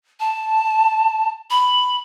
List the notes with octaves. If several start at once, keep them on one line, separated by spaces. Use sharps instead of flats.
A5
B5